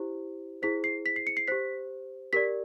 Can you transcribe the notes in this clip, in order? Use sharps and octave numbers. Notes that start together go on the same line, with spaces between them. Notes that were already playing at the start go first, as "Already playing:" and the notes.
Already playing: E4 G4 C5
E4 G#4 C5 B6
C7
B6
C7
C#7
C7
G4 C5 B6
G4 A#4 D5 B6